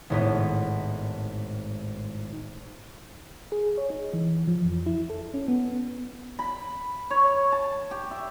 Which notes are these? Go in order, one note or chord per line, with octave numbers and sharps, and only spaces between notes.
G#1 A2 B3
G#4
C#5
D#4
E3
F3
F2
E4
A4
C#4
B3
B5
C#5
A5
G4
E5